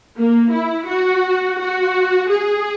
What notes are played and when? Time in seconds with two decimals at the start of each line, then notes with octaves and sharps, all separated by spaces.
0.16 A#3
0.51 E4
0.87 F#4
1.59 F#4
2.30 G#4